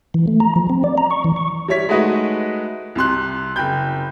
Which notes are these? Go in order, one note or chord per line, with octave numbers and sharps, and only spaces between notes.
E3
A3
A#5
F3
C4
D5
A#5
C#6
E3
C#6
G3 E4 C#5 B6
G#3 A3 D#4 F#4 B4 D#5
C2 C3 C6 F#6
F#1 G5 B5 G6